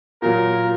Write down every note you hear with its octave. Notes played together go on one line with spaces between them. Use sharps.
A#2 F#3 A#3 A#4